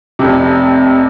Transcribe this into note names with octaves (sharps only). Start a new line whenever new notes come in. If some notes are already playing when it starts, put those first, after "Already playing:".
F1 F2 C3